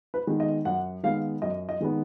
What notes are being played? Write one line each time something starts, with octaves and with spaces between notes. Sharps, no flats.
B4
D#3 G#3 B3
D#5
F#2 F#5
D#3 G#3 B3 F5
F#2 D#5
D#5
D#3 G#3 B3